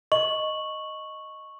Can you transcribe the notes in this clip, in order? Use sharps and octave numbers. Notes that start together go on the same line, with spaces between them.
D#5 C#6 F#7